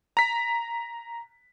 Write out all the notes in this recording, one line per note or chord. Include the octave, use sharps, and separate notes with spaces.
A#5 B6